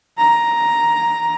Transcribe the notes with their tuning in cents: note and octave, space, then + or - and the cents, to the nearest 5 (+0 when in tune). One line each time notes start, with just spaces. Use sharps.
A#5 +5